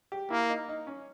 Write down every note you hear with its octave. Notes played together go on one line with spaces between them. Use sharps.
G4
A#3 E4
D#4
D#4
C#4